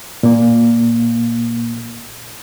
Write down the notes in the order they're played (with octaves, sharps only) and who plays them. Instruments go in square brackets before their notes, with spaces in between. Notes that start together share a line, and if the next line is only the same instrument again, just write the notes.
[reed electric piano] A#2 A#3